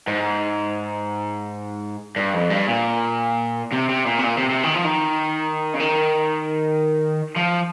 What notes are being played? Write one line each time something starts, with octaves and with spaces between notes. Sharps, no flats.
G#2
G2
F2
G2
A#2
C3
C3
A#2
C3
A#2
C3
C3
D#3
F3
D#3
C#3
D#3
F3